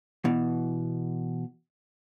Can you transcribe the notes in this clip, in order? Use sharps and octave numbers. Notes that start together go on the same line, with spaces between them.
B2 E3